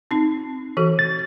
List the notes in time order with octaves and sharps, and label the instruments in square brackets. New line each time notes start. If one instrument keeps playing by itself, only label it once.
[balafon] C4 D#4
E3 F#4 A4
[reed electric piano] A6